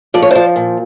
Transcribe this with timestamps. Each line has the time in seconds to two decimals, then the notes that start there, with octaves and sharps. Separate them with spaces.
0.14 F3 D5
0.22 C#5
0.31 F3 C5 D5
0.56 A#2